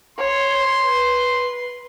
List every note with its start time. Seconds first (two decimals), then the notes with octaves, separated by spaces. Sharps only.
0.19 C#5 C6
0.85 B4